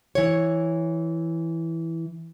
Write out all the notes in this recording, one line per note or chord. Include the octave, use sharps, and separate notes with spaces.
E3 C#5